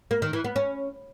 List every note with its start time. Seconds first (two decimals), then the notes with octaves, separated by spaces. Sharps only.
0.11 A#3
0.22 D#3
0.33 E3
0.44 B3
0.56 C#4